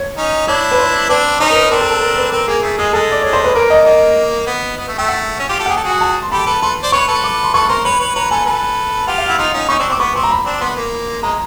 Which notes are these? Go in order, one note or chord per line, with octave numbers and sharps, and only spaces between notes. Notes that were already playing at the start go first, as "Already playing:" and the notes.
Already playing: C#5
C#4 D#4
D4 E4 C#5
B4
C5
C4 D4 B4
C#4 D#4 C5
A#4
B4
C4 D4 A#4
A4
A4
A#4
B4
C4 A#4
A#3 G#4
A3 G#4
G#3 G#4
G#3 A4
D5
G#3 C#5
C5
B4
A#3 A#4
D#5
A#3 D#5
B3
B3
A3
A3 G5
F#5
C#4
F4 G4
G4 A4
F#5
G#4 G5
A4
F#4 G#4
G#5
A5
C6
G4 A4 B5
A4 B4
A4 B4 C6
C5 D5
B4 C#5 C#6
A4 B4
D6
C6
A4 B4 C#6
A#4 C5 C6
B4 C#5 B5
B4 C#5
B4 C#5 A#5
A4 B4 G#5
A4 B4
F4 G4 F#5
F5
E4 F#5
D#4 F4 C6
C#4 D#4
C#4 D#4 C#6
C4 D4
C4 D6
B3 C#6
C4 C6
A#5
B5
C4 D4
B3 C6
A#3
G#3 A#5